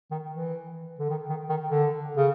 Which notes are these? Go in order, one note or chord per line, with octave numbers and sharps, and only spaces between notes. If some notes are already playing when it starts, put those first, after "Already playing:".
D#3
E3
D3
D#3
D#3
D#3
D3
C#3